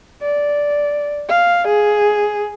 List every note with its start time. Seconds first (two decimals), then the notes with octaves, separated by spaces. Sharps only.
0.22 D5
1.29 F5
1.67 G#4